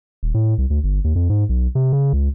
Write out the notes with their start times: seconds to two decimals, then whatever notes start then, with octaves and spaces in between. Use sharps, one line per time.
0.23 D#1
0.34 A2
0.58 C2
0.70 D2
0.84 G1
1.04 D#2
1.16 F2
1.30 G#2
1.49 B1
1.75 C3
1.93 C#3
2.13 C#2